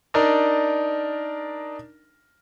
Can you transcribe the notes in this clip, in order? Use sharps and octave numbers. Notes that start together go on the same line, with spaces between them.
D4 D#4 A#4 D5